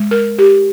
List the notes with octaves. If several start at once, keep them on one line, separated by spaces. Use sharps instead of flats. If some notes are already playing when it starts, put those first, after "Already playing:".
Already playing: G#3
A#4
G4